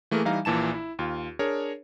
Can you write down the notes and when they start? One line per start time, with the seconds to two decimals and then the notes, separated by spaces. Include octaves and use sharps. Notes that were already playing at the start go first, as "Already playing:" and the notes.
0.11 E3 A3 A#3 G#4 A#4
0.25 E3 G3 D#4 F5 A#5
0.45 A#1 A#2 E3 A5 E7
0.74 E4
0.99 D#2 F4
1.39 D4 G#4 A#4 C#5